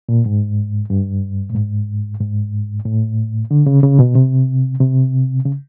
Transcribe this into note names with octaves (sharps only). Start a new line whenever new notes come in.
A#2
G#2
G2
A2
G#2
G#2
A2
D3
C#3
C#3
B2
C3
C3
C#3